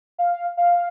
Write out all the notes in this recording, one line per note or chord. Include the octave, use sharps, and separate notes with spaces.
F5
F5